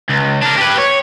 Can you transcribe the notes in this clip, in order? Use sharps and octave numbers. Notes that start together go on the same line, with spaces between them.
C#2
D4 A#4
G4 B4
C#5